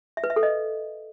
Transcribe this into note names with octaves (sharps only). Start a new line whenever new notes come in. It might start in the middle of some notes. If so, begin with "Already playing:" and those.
E5
B4
E5
A4
D#5